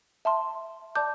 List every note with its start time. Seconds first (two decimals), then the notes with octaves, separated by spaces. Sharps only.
0.25 E5 A5 C6
0.95 D5 A5 D6 G6